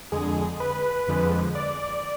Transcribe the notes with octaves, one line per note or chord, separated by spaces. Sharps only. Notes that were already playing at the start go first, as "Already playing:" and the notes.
F2 D3 G#3 G#4
B4
F2 D3 F3 G#3
D5